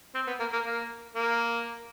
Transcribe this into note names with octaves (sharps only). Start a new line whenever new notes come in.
C4
B3
A#3
A#3
A#3
A#3